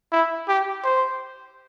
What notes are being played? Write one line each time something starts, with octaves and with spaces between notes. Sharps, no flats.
E4
G4
C5